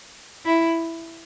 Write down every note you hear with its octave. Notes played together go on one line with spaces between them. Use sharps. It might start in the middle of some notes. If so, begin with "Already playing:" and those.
E4